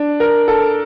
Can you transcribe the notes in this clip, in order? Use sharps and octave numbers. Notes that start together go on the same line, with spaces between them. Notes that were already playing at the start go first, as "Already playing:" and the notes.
Already playing: D4
A#4
A4